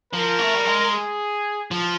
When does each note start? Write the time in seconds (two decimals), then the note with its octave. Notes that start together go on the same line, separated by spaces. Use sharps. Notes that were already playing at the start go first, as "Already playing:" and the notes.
0.13 F3 A#4
0.39 A3
0.54 G3
0.65 G#3
0.91 G#4
1.71 F3